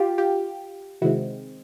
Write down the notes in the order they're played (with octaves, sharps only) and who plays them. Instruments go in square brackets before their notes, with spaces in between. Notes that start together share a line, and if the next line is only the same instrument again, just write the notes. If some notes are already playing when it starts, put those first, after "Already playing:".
Already playing: [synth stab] F4 G4
F4 G4
C3 D#3 G#3 C4 E4 F#4